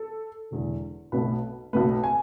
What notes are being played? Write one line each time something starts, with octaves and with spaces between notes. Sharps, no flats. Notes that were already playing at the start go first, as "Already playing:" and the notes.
Already playing: A4
E1 E2 D3
B1 B2 A3 B4
B1 B2 A3 B4
G#5